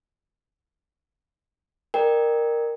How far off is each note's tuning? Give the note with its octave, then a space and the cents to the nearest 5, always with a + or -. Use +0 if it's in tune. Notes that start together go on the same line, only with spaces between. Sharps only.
A#4 +0 D5 +45 G5 +10